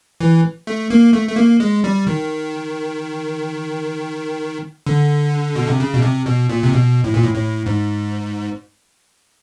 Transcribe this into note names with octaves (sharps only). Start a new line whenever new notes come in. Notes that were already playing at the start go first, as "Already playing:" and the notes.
E3
A3
A#3
A3
A3
A#3
G#3
G3
D#3
D3
B2
C3
C#3
B2
C3
B2
A#2
C3
B2
A2
A#2
A2
A2
G#2